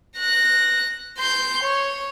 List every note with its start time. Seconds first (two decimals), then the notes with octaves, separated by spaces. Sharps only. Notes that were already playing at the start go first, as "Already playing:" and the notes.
0.18 F#6 A#6
1.19 C6 G6
1.63 C#5